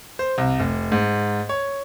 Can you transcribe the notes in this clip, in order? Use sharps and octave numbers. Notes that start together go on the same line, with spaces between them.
C5
C2
F1
G#2
C#5